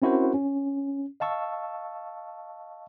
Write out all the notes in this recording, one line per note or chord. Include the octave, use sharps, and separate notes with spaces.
C4 C#4 E4 F#4 A#4 C5
C#4
D#5 F5 A5 C#6 E6